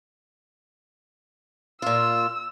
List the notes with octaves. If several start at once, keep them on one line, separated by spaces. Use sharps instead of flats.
A#2 F4 E6